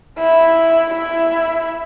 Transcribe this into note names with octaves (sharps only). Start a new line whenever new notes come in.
E4
E4